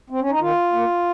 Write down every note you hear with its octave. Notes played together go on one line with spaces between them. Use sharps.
C4
C#4
D#4
D#3 F4
A#3